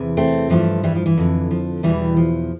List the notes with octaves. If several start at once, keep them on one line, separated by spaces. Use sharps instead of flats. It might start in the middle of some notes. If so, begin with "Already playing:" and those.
Already playing: E2 C3 E3
A3 C4
G2 E3 F3 A3
E3 G3
F3
E3
F2 D3
F3
E2 B2 E3 G3
F3